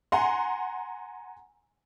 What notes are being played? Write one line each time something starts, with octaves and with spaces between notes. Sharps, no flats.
F#5 G#5 A#5 C6